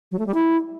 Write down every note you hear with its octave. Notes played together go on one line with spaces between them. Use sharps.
F#3
A3
G3
E4